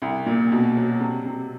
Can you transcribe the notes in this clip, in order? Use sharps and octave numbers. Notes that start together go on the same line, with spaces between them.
C2
A#2
B2
F#3
C3
C3